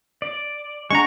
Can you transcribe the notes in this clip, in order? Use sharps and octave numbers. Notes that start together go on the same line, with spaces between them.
D5
G#3 D4 F#5 A#5 C#6